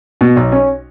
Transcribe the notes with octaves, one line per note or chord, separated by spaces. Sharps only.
B2
B1
C#4